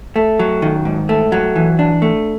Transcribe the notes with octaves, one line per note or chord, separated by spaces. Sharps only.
A3
F#3
D#3
G#2
A3
F#3
E3
D4
A3